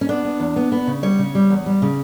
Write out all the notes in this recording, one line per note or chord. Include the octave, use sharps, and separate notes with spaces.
C#4
B3 D4
B3
E2
B3
B3
C#3
G3 C#5
C#3
G3
E2
G3
C#3